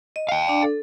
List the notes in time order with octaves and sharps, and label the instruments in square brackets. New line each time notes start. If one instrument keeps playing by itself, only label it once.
[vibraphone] D#5
[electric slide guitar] F5 G5
[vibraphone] D4 D5
A4